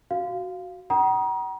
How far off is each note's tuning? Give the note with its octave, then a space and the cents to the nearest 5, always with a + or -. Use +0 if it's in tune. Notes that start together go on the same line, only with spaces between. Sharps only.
F#4 +0 F5 +0
F#5 +45 A#5 +35 D#6 +0